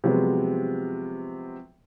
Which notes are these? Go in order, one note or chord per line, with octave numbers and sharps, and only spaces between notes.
C3 F3 F#3 G#3 B3